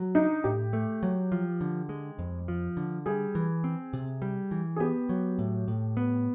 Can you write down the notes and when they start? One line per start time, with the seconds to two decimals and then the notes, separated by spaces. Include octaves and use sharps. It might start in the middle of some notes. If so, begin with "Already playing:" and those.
Already playing: F#3
0.15 D4 D#4
0.44 A2 G4
0.73 A3
1.03 F#3
1.32 F3
1.61 D3
1.89 G#3
2.19 F2
2.48 F3
2.77 D3
3.06 G3 G#4
3.35 E3
3.64 C4
3.93 C3
4.22 G3
4.51 E3
4.76 G#4
4.80 B3 G4
5.09 F#3
5.39 A2
5.68 A2
5.97 B3